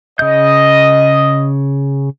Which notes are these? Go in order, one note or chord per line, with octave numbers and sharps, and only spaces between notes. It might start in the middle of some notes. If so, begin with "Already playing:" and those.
C#3 D#5 G6